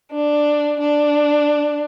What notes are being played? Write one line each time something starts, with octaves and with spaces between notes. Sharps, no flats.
D4
D4